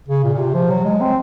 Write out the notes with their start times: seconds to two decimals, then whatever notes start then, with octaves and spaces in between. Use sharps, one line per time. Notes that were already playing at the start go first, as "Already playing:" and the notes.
0.08 C#3
0.24 A#2
0.34 A#2
0.38 C3
0.54 F3
0.70 F#3
0.84 G#3
1.01 C4